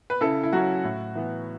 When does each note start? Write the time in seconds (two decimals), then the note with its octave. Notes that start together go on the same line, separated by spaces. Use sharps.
0.10 B4
0.21 C#3 E4 A4
0.43 E4
0.53 F#3 C#4 F#4
0.84 A2
1.15 E3 B3